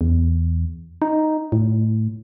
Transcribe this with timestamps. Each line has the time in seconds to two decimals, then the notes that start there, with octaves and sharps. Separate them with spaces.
0.01 E2
1.02 D#4
1.52 A2